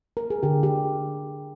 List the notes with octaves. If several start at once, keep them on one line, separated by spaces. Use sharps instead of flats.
A#4
G#4
D3 G4
G4